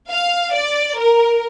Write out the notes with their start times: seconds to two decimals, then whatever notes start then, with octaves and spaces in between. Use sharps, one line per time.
0.10 F5
0.54 D5
0.98 A#4